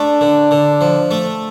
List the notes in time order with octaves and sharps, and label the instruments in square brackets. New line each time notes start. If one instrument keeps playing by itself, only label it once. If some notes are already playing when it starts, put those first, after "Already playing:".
Already playing: [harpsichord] A3 [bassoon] D4
[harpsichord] D3
D3
F3
A3